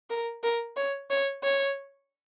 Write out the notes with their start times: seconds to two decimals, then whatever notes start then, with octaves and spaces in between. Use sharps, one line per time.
0.10 A#4
0.43 A#4
0.77 C#5
1.10 C#5
1.43 C#5